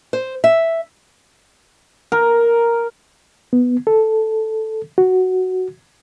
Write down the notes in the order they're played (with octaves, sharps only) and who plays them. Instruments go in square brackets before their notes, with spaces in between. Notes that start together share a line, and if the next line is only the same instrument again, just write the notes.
[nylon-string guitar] C5
E5
[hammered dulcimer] A#4
[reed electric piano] B3
A4
F#4